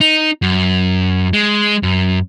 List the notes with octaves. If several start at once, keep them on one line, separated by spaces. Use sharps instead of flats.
D#4
F#2
G#3
F#2